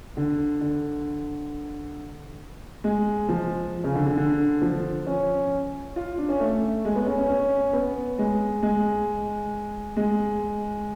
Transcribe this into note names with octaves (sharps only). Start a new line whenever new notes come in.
D3
D3
G#3
F3
C#3
D3
D3
D3
F3
C#4
F4
D4
C#4
A3
G#3
B3
C#4
C#4
C#4
B3
G#3
G#3
G#3